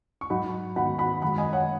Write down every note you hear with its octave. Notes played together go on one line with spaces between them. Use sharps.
C#6
G#2 F#3 D#4 F#4 F#5 B5
G#2 D#3 B3 D#4 F#4 F#5 B5
F#5 B5
F#2 D#3 G#3 F#5 B5
D#5 G#5
C#5 F#5